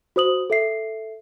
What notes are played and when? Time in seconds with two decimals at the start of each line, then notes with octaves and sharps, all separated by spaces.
0.16 F#4 C5 D#6 F#7
0.50 A4 E5 C7